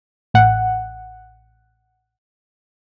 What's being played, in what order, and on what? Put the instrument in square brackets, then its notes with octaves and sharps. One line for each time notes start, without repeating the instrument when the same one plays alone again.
[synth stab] A1 F#5